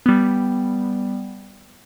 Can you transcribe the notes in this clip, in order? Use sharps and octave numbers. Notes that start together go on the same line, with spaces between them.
G3 B3